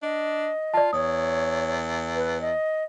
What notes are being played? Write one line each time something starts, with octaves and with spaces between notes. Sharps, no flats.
D4 D#5
F4 D5 A5
E2 C#5 D#6
B4
D#5